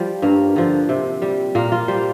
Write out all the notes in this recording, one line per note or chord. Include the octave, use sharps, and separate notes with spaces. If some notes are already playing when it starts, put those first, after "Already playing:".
Already playing: F3 G3
G2 A#3
D3 F3
C3
G3
A#2 A#3
F4
G3 C5